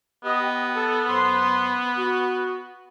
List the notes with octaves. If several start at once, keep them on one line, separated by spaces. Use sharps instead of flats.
B3 G4 D#5
A4
F#2 C5 C6
F#4